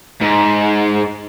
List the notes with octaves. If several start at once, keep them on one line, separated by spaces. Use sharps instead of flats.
G#2